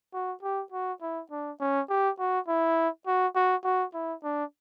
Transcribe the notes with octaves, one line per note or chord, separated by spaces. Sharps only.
F#4
G4
F#4
E4
D4
C#4
G4
F#4
E4
F#4
F#4
F#4
E4
D4